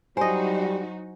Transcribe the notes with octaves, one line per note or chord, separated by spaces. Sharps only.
F#3 G3 D#4 E4 F#4 C5 D#5 G#5